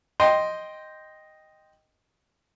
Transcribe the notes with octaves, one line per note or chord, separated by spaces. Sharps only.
D#5 G5 C6